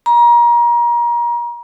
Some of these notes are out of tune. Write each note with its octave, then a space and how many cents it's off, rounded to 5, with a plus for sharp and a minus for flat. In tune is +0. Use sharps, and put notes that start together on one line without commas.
A#5 +30